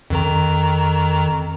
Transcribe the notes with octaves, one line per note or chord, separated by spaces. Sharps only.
F2 D#3 A#5